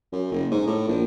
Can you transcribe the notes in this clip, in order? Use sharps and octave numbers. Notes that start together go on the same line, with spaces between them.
F#2
F#1
G#2
A2
A#1